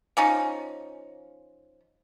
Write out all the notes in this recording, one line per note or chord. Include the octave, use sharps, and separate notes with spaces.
F3 C#4 D#4